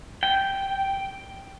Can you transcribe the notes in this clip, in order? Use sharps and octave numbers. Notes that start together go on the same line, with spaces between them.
G5